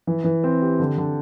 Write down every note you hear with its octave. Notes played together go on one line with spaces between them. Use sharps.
E3
E3
C4
G4
D3
D3